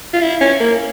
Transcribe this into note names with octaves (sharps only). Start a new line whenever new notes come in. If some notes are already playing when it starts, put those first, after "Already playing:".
F4
E4
C#4
A#3